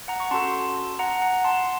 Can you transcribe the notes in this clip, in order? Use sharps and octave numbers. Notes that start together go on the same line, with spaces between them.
F#5 A#5
C#6
C#4 F#4 A4 A5 C6
F#5 A#5
F#5 A#5
A5 C6